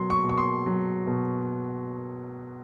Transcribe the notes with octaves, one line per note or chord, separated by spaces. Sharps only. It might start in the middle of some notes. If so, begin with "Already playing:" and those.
Already playing: B2 F#3 C6
C#6
B2
C#6
C6
F#3
B2